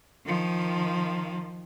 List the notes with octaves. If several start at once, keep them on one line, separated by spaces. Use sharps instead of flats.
D#3 F3